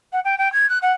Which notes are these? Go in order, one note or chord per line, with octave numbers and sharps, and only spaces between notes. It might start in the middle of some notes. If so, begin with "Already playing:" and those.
F#5
G5
G5
G#6
F#6
F#5